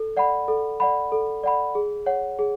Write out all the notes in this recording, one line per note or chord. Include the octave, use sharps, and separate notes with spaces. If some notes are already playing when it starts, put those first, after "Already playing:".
Already playing: A4
D5 F#5 B5
A4
D5 F#5 B5
A4
D5 F#5 B5
G#4
C#5 F#5
G#4